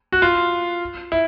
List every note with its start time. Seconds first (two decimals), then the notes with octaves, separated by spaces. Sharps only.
0.12 F#4
0.22 F4
1.12 E4